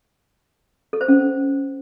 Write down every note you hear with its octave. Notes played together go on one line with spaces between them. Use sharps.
A4
C5
C#4